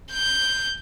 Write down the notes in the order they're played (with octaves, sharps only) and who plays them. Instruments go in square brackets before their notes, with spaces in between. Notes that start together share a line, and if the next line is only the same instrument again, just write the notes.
[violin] G6